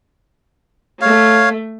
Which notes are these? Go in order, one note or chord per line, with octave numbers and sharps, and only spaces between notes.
A3 C#5 F5